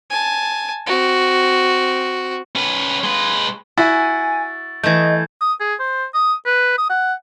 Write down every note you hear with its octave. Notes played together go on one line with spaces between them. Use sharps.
G#5 A5
C4 F#4
C#4 B4
G#3 B4
E4 F#4 G#5 A6
E3 A3 D#5 G6 G#6
D#6
G#4
C5
D#6
B4
D#6
F#5